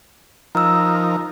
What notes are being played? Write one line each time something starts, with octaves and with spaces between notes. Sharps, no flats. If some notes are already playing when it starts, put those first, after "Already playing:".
F3 D#4 A#4 A#5 E6